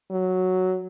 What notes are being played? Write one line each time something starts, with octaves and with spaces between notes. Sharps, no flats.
F#3